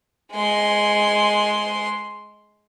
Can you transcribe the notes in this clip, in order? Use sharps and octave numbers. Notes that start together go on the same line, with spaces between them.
G#3 C6